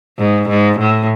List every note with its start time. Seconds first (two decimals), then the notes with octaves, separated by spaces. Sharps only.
0.19 G#2
0.49 G#2
0.79 A2